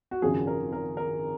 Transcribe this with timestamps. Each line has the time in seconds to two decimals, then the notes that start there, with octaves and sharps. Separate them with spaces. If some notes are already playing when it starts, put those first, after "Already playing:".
0.11 F#4
0.22 G#1 F#2 C#3 F3 G#4
0.47 A#4
0.72 A#4
0.97 A#4